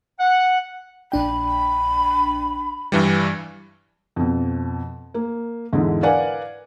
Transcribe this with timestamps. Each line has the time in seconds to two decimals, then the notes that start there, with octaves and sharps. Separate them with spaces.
0.20 F#5
1.12 A#1 D4 G5 B5
2.92 G2 E3 G3
4.16 F2 B2
5.14 A#3
5.72 E2 G#2 D3 E3
6.03 A#4 B4 D5 F5 F#5 G#5